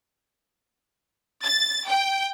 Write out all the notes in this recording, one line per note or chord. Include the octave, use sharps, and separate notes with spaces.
A6
G5